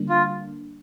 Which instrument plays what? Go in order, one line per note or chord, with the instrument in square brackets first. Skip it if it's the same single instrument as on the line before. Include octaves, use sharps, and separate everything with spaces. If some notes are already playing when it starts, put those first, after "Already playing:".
Already playing: [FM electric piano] D3 G3 A#3 D4
[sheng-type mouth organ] F4